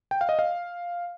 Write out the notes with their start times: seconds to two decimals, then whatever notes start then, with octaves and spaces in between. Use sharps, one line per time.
0.11 G5
0.21 F5
0.29 D#5
0.39 F5